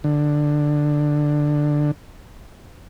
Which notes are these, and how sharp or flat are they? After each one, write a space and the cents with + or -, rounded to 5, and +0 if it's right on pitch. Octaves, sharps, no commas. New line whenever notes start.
D3 +10